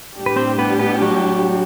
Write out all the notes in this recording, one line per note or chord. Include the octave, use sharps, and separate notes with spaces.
A2 G3 D4 G4
B4
C4 C5
B3 B4
B3 B4
F#3 F#4